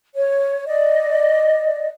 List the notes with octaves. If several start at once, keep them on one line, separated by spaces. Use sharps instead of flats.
C#5
D5 D#5